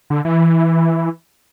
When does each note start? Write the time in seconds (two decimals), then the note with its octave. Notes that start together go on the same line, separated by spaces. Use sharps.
0.10 D3
0.25 E3